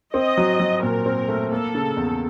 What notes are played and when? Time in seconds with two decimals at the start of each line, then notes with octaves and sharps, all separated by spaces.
0.14 C4 D#5
0.37 F#3
0.60 F#3
0.83 A#2 A#4
1.06 C4
1.29 A3
1.52 A#3 A4
1.75 C#3
1.97 E2